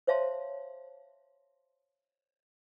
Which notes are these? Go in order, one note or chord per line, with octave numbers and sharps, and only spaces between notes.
C5 C#5 E5 F5 A5 C6